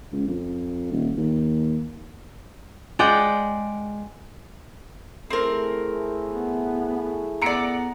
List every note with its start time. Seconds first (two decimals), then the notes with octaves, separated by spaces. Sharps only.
0.12 C#2
0.27 F2
0.92 D#1
1.17 D#2
2.99 G#3 D5 F#5 G5
5.30 A3 C4 E4 G#4 A#4
6.30 B3
7.42 B3 D5 A#5 E6 C#7 D7